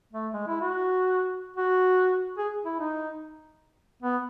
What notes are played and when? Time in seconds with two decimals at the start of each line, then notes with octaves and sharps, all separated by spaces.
0.13 A3
0.34 G#3
0.48 E4
0.61 F#4
1.56 F#4
2.38 G#4
2.65 E4
2.80 D#4
4.02 B3